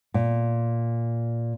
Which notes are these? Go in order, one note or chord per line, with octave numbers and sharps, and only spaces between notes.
A#2